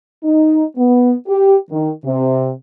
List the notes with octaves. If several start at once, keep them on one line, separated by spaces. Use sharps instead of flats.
D#4
B3
G4
D#3
C3